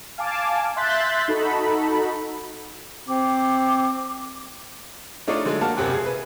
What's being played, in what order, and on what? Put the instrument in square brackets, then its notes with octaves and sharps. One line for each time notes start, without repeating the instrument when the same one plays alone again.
[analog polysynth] F5 G#5 A5 D6
E5 C6 F#6 G6 A6 B6
D#4 F#4 A4 B5
[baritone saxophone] C4 [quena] D6
[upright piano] A3 D4 D#4 F4 C#5 D5
D3 F#3 G#3 A3
A#3 F#4 A5 F6
E1 F#2 C3 G4 F#6
G#4
B4